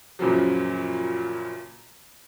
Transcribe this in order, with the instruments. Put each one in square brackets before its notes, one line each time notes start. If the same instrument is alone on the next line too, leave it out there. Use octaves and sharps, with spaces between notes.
[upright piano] F#2 A#2 C#3 F3 F#3